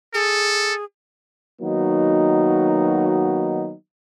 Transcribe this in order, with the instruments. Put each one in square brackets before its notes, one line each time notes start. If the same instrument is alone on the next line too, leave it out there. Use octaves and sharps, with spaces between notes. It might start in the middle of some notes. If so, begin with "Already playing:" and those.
[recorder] G#4 [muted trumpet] A4
[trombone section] D#3 F#3 A#3 B3 D#4 F#4